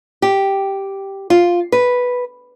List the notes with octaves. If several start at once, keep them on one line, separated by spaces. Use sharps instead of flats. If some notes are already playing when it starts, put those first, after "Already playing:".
G4
F4
B4